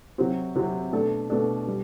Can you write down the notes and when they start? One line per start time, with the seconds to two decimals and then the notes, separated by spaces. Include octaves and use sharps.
0.18 C3 F#3 C4 F#4
0.55 C3 F#3 C4 F#4
0.92 B2 A3 D4 A4
1.30 B2 A3 D4 A4
1.67 B2 G3